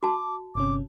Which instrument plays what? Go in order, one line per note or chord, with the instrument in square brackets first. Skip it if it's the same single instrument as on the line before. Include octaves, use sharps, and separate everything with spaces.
[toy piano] F#4 A5 [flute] D6
[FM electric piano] G1 C3 C#4 [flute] D6